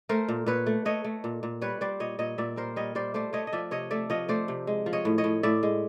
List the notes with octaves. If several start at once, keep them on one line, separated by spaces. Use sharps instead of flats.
A3 A#4 C5
A#2
A#2 B4 C#5
A3
A3 C#5 D#5
A3
A#2
A#2
G3 B4 C#5
G3 C5 D5
A#2 C#5 D#5
A#2 C#5 D#5
A#2 D5 E5
G3 A#4 C5
G3 C#5 D#5
G3 C5 D5
A3 C5 D5
A3 C#5 D#5
D#5
F3 D5 E5
C3 C#5 D#5
A3 D5 E5
F3 C#5 D#5
A3 C5 D5
C3
G#3
F3
C#5 D#5
A2
C#5 D#5
A2
A2 D5 E5
G#3